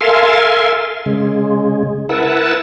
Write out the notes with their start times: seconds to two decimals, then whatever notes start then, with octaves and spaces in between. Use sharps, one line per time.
0.01 A4 A#4 E5 F5 G#5 C6
1.06 C#3 G#3
2.09 E4 A#4 B4 F#5 A5 E6